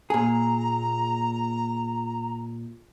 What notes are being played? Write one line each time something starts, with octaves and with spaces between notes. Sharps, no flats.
A#2 G#4 A#5